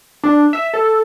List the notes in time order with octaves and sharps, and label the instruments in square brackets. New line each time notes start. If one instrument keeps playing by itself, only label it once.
[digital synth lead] D4
E5
A4